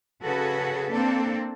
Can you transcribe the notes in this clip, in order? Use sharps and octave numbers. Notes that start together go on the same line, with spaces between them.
C#3 F#4 G#4 A4 B4
A#3 C4 D4 A4